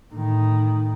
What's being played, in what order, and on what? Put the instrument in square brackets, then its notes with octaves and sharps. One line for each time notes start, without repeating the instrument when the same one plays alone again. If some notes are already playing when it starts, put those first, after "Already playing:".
[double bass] A2 D#3